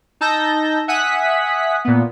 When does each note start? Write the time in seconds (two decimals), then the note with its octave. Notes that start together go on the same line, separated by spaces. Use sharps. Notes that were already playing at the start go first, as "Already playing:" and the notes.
0.21 D#4 A5 E6 G6 A#6
0.88 E5 F#5 G#5 D#6 F#6 B6
1.85 A#2 B3